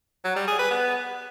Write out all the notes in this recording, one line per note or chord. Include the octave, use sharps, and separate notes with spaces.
F#3
G3
G#4
B4
B3